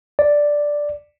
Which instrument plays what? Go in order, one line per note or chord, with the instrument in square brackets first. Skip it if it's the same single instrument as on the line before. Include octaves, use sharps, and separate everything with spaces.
[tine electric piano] D5